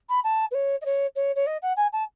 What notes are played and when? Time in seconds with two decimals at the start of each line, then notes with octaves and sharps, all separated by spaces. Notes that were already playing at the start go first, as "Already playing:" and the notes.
0.09 B5
0.24 A5
0.51 B4
0.54 C#5
0.81 D#5
0.85 C#5
1.15 C#5
1.35 C#5
1.46 D#5
1.62 F#5
1.76 G#5
1.92 A5